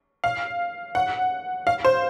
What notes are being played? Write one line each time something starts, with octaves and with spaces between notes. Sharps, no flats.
F5
F#5
F5
C5